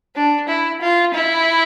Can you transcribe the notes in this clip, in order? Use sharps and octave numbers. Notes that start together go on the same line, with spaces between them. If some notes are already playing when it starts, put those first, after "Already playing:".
D4
E4
F4
E4